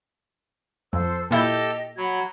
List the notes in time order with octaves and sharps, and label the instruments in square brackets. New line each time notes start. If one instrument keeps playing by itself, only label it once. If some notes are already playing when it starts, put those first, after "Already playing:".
[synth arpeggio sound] F2 [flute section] A4 C5 E6
[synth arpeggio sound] A#2 E4 G6 [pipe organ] G4 A4 [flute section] D#5
[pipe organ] F#3 [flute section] F#5 B5 G#6